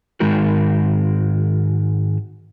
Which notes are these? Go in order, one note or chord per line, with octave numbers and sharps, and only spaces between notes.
G#2 D#3 G#3 D#4 F#4 A#4